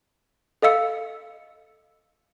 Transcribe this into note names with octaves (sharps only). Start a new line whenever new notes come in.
A4 D#5 F5 E6 C#7